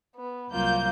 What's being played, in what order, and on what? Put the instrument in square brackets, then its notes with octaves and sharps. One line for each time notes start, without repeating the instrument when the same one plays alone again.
[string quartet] B3
[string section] C2 G6 [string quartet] F#3 A#3 F4